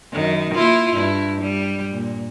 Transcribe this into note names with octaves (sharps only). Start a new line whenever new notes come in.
F#2 D#3
A#3 E4 F4
G2 E4
G3
A#2